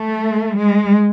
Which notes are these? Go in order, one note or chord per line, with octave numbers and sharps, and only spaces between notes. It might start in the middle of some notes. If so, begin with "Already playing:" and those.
Already playing: A3
G#3